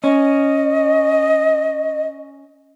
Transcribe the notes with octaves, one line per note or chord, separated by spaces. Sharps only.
C#4 D#5